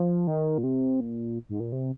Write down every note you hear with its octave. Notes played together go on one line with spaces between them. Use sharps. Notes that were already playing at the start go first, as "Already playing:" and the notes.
Already playing: F3
D#3
A#2
C3
A#2
G#2
A#2
C3